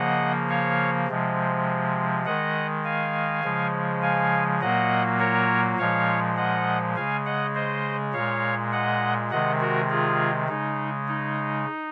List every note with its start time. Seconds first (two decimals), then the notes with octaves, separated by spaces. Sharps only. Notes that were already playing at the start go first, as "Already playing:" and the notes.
Already playing: C#3 F3 A#3 D#5 F#5
0.49 C#5 F5
1.08 C3 F3 G#3
2.25 D#3 G#3 D#5 F#5
2.84 F5 G#5
3.44 C#3 F3 G#3
4.02 F5 G#5
4.61 A#2 F#3 A#3 D#5 F#5
5.19 A#4 C#5
5.78 A#2 F3 G#3 C#5 F5
6.37 D#5 F#5
6.96 C#3 G#3 F5 G#5
7.25 D#5 F#5
7.55 C5 D#5
8.13 A#2 G#3 C#5 F5
8.72 D#5 F#5
9.31 C3 D#3 G#3 D#5 F#5
9.60 F#4 A#4
9.90 F4 G#4
10.49 C#3 G#3 D#4
11.08 D#4